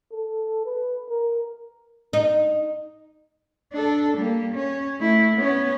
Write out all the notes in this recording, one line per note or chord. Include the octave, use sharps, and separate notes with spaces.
A4
B4
A#4
D#4
D4 A4
G3 A#3
C#4
A3 E4
B3 C#4